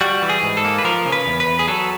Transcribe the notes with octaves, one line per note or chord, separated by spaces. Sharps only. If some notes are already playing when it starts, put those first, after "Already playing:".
G3 F#4
E3
G#4
G#2
A4
A#3
B4
F3 A#4
C#3
B4
E2
B4
E2
G#4
F#3 A4